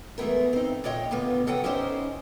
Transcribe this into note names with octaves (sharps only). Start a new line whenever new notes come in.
E3 G#3 A3 B3 A#4
C4 D#4
A#2 G#3 C#5 D#5 G5
B2 D3 D#3 A#3 B3 F4
C#3 F#3 A4 B4 F#5 G5
C#4 D#4 E4 G4 C5 D#5